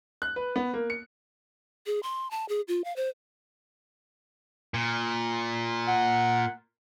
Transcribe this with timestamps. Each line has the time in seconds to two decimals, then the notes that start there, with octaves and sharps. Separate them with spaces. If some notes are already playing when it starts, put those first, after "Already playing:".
0.22 F#6
0.36 B4
0.56 B3
0.74 A#3
0.90 C#7
1.86 G#4
2.03 C6
2.31 A5
2.49 G#4
2.68 F4
2.84 F5
2.96 C5
4.74 A#2
5.87 F#5